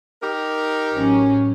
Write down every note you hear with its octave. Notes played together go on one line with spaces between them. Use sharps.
D#4 G4 A#4
A1 F#3 C#4